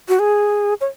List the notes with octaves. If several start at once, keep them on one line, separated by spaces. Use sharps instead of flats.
F#4
G#4
C#5